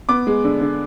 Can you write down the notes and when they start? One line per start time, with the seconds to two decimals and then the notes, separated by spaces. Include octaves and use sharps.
0.09 B3 D6
0.27 G#3
0.44 D3
0.61 D3